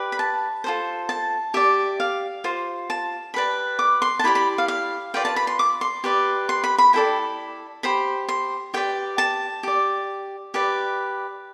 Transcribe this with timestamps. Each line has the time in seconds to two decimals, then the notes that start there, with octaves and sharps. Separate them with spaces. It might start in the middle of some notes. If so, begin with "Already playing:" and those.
Already playing: G4 B4 D5
0.12 B5
0.19 A5
0.64 F4 A4 C5
1.09 A5
1.54 G4 D5 E5
2.00 F5
2.44 F4 C5
2.90 A5
3.34 G4 B4 D5 B5
3.79 D6
4.02 C6
4.19 A5
4.24 E4 G4 D5 B5
4.35 B5
4.58 F5
4.68 F5
5.14 F4 B4 D5 G5
5.25 A5
5.36 B5
5.47 C6
5.59 D6
5.81 C6
6.04 G4 B4 D5
6.49 C6
6.64 B5
6.78 B5
6.93 E4 A4 D5 G5
7.83 G4 C5 B5
8.29 C6
8.74 G4 B4 D5 G5
9.18 A5
9.63 G4 D5
10.54 G4 B4 D5